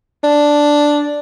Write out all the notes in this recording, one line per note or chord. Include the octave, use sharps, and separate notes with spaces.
D4